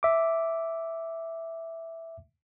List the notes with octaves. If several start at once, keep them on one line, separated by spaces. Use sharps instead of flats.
E5 D6